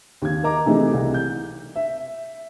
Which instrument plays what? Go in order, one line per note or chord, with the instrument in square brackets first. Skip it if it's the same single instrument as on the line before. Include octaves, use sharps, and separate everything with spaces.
[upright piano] D#2 G#6
A#4 D#5 A#5 D6
C3 E3 A3 D#4 G#4
C2
G6
E5